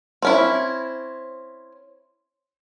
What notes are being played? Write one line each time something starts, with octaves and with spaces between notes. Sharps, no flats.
C4 C#4 E4